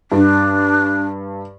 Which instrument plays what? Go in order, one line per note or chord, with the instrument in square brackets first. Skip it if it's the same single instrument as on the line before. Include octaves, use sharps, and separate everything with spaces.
[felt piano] G2 [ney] D4